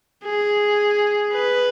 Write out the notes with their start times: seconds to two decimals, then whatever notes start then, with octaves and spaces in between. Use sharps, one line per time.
0.25 G#4
1.33 B4